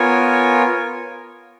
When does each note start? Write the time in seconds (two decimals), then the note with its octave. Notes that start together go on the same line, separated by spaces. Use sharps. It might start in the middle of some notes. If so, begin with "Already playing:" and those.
Already playing: B3 F4 A#4 C#5 G#5